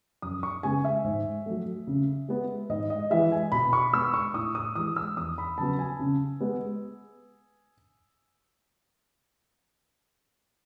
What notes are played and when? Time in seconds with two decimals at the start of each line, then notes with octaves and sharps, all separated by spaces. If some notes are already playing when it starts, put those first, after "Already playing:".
0.22 F#2 D#6
0.43 C#6
0.63 C#3 G#3 B3 G#5
0.85 E5
1.04 G#2
1.46 F#3 A3
1.87 C#3
2.29 G#3 B3
2.69 G#2 D#5
2.90 D#5
3.10 E3 G#3 E5
3.32 G#5
3.52 B2 B5
3.73 C#6
3.93 G#3 B3 E6
4.14 C#6
4.34 A2 D#6
4.55 D#6
4.75 E3 G#3 D#6
4.97 E6
5.16 E2 D#6
5.38 B5
5.58 C#3 F#3 B3 A5
5.79 G#5
5.99 C#3
6.41 G#3 B3